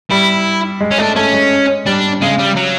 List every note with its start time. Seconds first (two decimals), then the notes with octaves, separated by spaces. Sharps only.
0.10 G3 E4
0.81 G#3
0.91 C#4
0.98 A3 D4
1.16 A3 C#4
1.34 G#3
1.86 G3 D4
2.21 C#3 G#3
2.39 G3
2.56 F#3